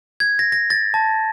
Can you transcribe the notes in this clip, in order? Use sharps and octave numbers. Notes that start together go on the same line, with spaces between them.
G#6
A#6
A#6
A6
A5